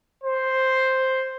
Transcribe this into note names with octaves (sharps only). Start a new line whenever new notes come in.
C5